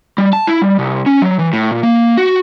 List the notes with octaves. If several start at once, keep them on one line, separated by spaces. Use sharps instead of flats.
G3
A5
E4
G3
C2
C#4
F#3
E3
A2
A#2
A#3
F#4